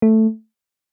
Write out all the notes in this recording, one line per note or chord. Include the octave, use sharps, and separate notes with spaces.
A3